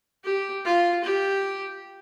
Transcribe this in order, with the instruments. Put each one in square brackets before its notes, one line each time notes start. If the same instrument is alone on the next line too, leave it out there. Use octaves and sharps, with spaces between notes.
[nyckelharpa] G4
F4
G4